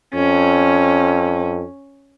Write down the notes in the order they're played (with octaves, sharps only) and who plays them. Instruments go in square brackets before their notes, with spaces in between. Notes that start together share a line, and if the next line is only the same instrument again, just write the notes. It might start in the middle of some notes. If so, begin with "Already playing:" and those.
[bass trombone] F2 [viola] C#4